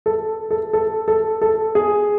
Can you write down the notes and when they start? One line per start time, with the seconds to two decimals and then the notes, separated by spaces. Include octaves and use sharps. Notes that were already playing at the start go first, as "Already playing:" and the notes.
0.06 A4
0.51 A4
0.73 A4
1.08 A4
1.42 A4
1.75 G#4